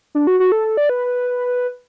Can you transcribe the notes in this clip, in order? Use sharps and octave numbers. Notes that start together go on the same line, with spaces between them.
D4
F#4
F#4
A4
D5
B4